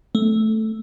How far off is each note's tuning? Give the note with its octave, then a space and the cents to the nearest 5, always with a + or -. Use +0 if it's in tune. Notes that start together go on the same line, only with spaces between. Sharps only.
A3 -5